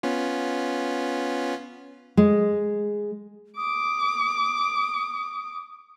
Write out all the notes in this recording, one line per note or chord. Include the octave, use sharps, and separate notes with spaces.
B3 C#4 F4
G#3
D6 D#6